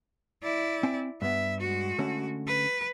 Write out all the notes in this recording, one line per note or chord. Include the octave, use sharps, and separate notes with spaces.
E4 D5
C4 G#5
G2 B3 E5
G#3 F#4
D3 A3 C#4
B4